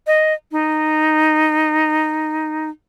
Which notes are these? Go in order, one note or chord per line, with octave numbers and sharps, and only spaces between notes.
D#5
D#4